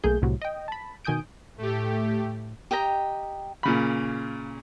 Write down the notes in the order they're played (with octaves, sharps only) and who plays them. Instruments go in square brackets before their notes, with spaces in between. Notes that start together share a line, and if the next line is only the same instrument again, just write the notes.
[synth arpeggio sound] B1 A3 A#3 G#4 G6
C2 A2 C3 F#3
D#5 G5
A5 B5
B2 D#3 G#5 D#6 G6 D7
[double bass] A2 [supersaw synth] A3 G4
[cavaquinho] G4 D#5 G5 A#5
[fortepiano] A#2 C#3 B5